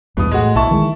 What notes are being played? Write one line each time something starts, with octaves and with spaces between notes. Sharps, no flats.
B1 E2 G2 B2 D#6
A2 G#3 F#4
B1 E4 A5 C#6
D#3 E3 G#3